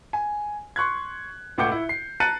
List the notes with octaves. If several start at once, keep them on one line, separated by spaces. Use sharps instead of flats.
G#5
C6 C#6 F#6 G#6
C#2 A2 F#5 D6 G6 C#7
E4
C7
A5 A#5 F#6 A6 C#7 D#7